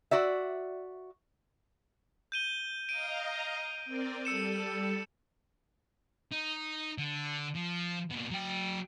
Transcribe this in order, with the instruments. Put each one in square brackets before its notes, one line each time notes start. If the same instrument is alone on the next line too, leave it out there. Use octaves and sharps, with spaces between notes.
[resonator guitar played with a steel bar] F#4 D5 E5
[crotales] G6 D#7 G7
[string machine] D#5 F5 A#5 [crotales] D7 D#7
[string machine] C4 A#4 D5
[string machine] G3 A4 [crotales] E6 C#7 E7
[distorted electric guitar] D#4
D3
F3
A#2 B3
F#3 G5